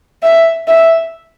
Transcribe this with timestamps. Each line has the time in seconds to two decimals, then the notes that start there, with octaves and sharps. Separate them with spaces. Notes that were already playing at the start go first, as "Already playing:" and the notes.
0.22 E5
0.68 E5